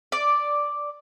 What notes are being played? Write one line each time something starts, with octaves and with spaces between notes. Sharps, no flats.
D5